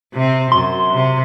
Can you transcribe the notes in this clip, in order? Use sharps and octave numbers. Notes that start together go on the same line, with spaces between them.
C3 C4
F#2 C6
C3